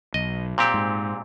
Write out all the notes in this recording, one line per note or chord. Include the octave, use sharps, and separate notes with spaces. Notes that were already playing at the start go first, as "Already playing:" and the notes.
B1 D#5
A#2 C4 G4
G#2